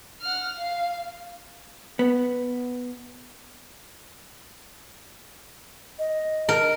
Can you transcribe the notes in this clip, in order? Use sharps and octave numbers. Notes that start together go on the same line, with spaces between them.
F#5 F6
F5
B3
D#5
A#4